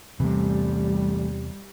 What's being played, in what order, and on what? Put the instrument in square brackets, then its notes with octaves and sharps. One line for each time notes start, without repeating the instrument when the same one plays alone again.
[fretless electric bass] E2 C3 [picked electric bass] E3 A3 [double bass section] G3